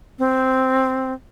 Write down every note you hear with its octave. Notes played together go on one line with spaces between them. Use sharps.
C4